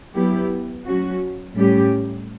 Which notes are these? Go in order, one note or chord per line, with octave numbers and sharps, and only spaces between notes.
F#3 B3 E4 G4
F#3 C#4 F#4
A2 G3 C#4 G4